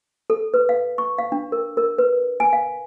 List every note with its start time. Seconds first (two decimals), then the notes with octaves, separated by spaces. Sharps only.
0.30 A4
0.54 B4
0.69 F5
0.98 C#6
1.18 F5
1.32 D4
1.52 A#4
1.77 A#4
1.98 B4
2.40 G#5
2.53 F5